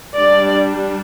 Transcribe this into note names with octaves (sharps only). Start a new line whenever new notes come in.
G3 D4 D5